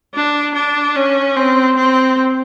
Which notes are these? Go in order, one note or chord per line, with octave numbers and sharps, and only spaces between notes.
D4
D4
C#4
C4
C4